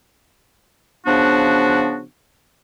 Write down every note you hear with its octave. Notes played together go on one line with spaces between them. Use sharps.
C#3 F3 B3 D4 F#4